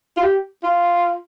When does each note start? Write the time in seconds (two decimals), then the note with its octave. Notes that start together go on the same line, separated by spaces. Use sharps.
0.16 F4
0.23 G4
0.63 F4